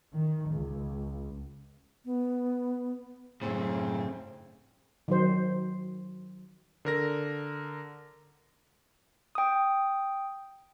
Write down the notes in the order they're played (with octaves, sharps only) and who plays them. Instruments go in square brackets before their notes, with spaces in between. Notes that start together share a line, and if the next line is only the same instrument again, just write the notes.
[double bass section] D#3
C#2
[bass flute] B3
[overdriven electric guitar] F#2 A2 [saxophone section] C#3 A3 C4
[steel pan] D#3 F#3 C5
[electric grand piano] D3 A#4 A#6
[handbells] G5 D#6